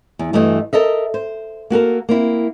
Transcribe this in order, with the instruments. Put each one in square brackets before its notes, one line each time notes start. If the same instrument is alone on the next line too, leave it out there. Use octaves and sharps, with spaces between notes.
[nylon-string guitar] E2
G2 E3 A3 F#4 D#5 G#5
A4 A#4 D#5 E5
C5
A#3 F#4 A4 A#4
A#3 C4 E4